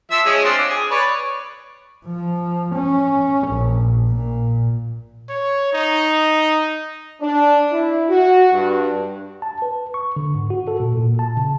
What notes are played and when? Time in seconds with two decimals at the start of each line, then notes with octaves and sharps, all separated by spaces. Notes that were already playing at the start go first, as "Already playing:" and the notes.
0.11 F3 E5 E6
0.26 G#3 C#4 G#4
0.44 C4 D4 F4
0.59 D6
0.70 G#4
0.91 B4 C#5 D5
2.06 F3
2.75 C#4
3.48 A#1
4.09 A#2
5.29 C#5
5.73 D#4
7.22 D4
7.71 E4
8.09 F#4
8.52 G2
9.42 A5
9.62 B4
9.94 C#6
10.16 D3
10.35 G#2
10.50 F#4
10.68 A4
10.80 A#2
10.97 A#2
11.19 A5
11.37 C#3